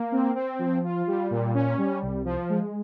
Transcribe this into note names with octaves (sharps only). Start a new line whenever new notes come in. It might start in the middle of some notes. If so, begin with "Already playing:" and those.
Already playing: A#3
C4
C4
F3
F4
G3
A#2
C#4
G3
C2
F3
G#3